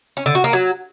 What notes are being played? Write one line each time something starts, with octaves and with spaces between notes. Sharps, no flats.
C#4
D3
F#4
A#3
F#3